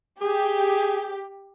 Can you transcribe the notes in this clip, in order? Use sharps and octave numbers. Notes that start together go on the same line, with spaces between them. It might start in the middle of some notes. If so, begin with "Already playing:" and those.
G4 G#4